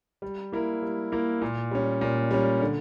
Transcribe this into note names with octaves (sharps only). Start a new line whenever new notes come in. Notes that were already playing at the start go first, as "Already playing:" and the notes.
G3
A#3 E4 A#4
G3
A#3 E4 A#4
A#2
G3 C#4
A#2
G3 C#4
D3